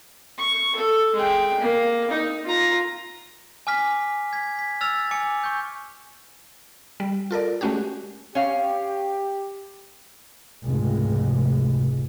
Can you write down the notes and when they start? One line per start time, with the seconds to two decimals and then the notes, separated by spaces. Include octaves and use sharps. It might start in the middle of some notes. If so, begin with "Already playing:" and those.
0.38 C#6
0.76 A4
1.14 G#3 G5
1.60 A#3
2.11 D#4
2.44 F4 A#5
3.67 G#5 D6 F6 B6
4.33 G#6 B6
4.59 B6
4.81 E6 F6 A6 F7
5.11 G#5 D6 C#7
5.43 C#6 G6
7.00 G3
7.31 F4 A4 A#4 D5
7.61 G#3 A3 C#4 F#4 G4
8.35 C#4 G4 F5
10.65 F1 C#2 G#2 G#3